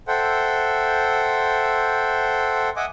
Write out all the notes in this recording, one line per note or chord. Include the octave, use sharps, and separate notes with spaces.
A4 C5 E5 F#5 G5
D#5 E5 F#5 G#5 D6